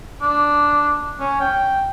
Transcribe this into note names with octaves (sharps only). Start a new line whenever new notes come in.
D4
C#4
G5